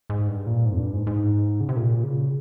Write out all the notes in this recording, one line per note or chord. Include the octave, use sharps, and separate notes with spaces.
G#2
G2
A#2
G#2
F2
G2
G#2
G#2
C#3
C3
A#2
C#3